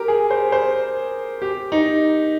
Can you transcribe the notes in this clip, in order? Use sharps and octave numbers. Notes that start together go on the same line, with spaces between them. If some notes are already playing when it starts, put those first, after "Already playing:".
Already playing: G4 A#4
G#4
C5
C5
G4
D#4